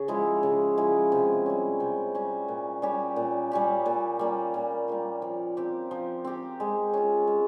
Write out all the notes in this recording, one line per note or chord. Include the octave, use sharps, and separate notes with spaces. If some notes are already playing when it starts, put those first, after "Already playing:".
Already playing: C#3
F3 G#3 E4
C#3
F3 G#3 E4
C3
G3 C#4
C3
G3 C#4
A#2
G3 C#4 G4
A#2
G3 C#4 G4
A#2
G3 A#3 F4
A#2
G3 A#3 F4
F3
C4 G4
F3
C4 G4
G#3
C#4 F4
G#3